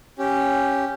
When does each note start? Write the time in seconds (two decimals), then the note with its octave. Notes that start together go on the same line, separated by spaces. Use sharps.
0.19 C#4 G4